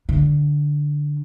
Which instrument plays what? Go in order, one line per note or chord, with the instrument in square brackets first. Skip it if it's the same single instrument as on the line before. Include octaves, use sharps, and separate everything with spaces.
[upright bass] D3